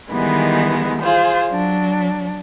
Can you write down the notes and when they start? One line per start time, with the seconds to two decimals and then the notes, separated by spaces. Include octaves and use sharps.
0.10 D#3 E3 G3 G#3 B3
1.01 F4 G#4 C5
1.50 F#3 D4